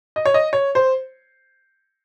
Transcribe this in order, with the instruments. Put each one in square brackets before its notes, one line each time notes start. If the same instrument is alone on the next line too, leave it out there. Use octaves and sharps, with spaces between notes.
[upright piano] D#5
C#5
D#5
C#5
C5